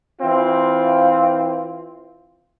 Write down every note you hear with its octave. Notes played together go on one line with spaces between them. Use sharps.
E3 C4 F4